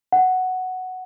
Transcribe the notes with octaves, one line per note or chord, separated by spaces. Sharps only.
F#5